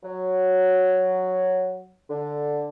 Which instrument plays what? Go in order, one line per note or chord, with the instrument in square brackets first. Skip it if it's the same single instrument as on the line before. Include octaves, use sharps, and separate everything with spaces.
[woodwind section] F#3
D3